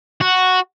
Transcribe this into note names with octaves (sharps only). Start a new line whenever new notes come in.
F#4